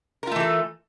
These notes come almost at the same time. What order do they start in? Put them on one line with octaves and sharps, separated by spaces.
A#4 F4 A3 E3 A4